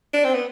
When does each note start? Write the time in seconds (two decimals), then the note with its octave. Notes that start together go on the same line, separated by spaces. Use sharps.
0.14 D4
0.24 C4
0.34 B3